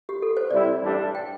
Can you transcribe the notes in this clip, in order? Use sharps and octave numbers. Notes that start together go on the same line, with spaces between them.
G4
A4
C5
C3 G3 E4 D5
A1 G2 G3 D4 A4
G5